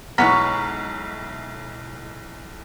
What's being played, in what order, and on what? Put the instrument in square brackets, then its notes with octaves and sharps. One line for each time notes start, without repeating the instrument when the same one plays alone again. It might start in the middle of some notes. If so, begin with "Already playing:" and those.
[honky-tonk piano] B1 E4 F6 [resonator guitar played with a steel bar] G#3 C#5 [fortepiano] B3 [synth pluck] A#5 B6